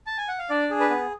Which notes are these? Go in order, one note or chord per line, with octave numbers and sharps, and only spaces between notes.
A5
G#5
F#5
F5
D4 D5
G#4
B4
B3